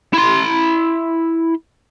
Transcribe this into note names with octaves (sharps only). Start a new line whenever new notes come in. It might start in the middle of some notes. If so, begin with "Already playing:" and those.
E4 C6